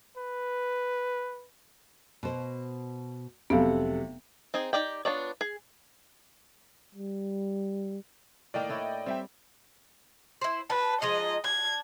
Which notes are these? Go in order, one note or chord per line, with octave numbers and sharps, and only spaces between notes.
B4
B2 C5
F1 C3 F#3 B3 A4 F5
C4 D#4 G#4
D#4 G4 D5 G5
B3 D4 F4 C#5 D5
G#4
G3
A2 D#3 A#3 D5 D#5 G5
D4 E4 C#5
G3 C4 E5 G5
E4 C5
B4 A5
F3 G#3 D#4 D#5
D4 G#6